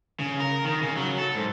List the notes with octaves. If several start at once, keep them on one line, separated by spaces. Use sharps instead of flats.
C#3
A#4
D#3
C#3
F#3
A4
G#2